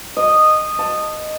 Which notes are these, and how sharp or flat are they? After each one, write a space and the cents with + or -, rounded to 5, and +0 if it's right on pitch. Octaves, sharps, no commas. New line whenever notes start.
D#5 -10
A5 +15